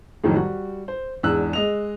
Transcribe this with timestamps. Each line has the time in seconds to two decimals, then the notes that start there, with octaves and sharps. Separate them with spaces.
0.24 F2 A2 D#3 F#3
0.36 G3 F#4
0.88 C5
1.23 E2 G#2 D4 E6 F#6
1.53 G#3 D#5 F7